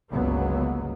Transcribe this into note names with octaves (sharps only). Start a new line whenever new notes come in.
G1 C#2 F#3 A#3 B3